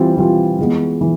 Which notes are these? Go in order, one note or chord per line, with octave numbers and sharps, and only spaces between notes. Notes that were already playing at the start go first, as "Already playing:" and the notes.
Already playing: E3 G3 C4 F4
E3 G3 C4 F4
E3 G#3 B3
E3